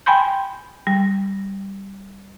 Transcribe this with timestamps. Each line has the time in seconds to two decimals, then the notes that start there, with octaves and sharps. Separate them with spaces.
0.06 G5 G#5 B5 C6 G6
0.87 G3